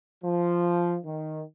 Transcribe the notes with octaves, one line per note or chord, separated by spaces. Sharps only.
F3
D#3